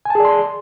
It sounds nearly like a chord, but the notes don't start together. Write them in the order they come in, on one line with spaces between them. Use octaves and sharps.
G#5 A5 G#4 D5 C6